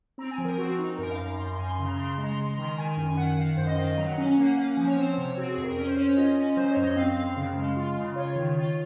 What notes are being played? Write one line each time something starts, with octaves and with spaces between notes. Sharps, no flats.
C4 A#5
G#5
F3
A#4
C4 F#4
D#4
F#2 A#4
F5
F#2
A#5
F#2 C6
A#5
F#2 G#5
C6
C#3 C6
A#5
C#3 C6
C6
G#3
A#5
C6
G#3
C6
D#3 A#5
D#3 G#5
F#2 G#5
D#3 F#5
D#3 F5
F#2 C5
D#5
D#3 F5
D#5
F#3 A#5
F#5
C#4 A#5
A#5
A#3
F#5
C#4 F5
F#5
F3 G#5
C#5
C4 C5
C3 C#5
C4 F#4
G#4
F2
A#4
C#4 A#4
C5
C#4 C#5
C#5
F4 D#5
C#4
F#3 C5
C#5
F#2
D#5
C4 F5
F#2
C#3
G#3
F4
C#3
F4 C#5
D#3
F4